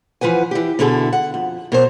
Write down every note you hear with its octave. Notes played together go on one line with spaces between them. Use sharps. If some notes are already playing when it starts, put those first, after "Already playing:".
E3 F3 B4 F#5 G#5
E3 G4
B2 D3 E4 G#4 A4
F#5
F2
B2 A#4 C5